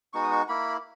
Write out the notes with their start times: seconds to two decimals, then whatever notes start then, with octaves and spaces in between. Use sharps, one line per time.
0.13 G#3 B3 D#4 F#4 C#6
0.23 D#6
0.31 C#6
0.49 A#3 E4 B5